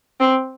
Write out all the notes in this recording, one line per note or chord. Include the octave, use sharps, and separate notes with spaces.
C4